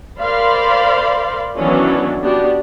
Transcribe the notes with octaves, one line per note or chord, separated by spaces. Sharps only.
A#4 C5 D5 F5 B5 C6
D#3 E3 F#3 B3 C#4 D4
B3 D4 F#4 G4